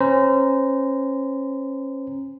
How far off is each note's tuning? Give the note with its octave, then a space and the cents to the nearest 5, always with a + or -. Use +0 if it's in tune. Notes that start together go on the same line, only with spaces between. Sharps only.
C#4 -30 C5 -30 A#5 +0